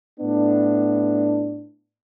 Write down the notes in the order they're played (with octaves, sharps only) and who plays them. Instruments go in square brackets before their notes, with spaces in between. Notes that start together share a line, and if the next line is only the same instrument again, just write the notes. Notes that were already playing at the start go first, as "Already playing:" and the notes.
[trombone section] A2 B3 D4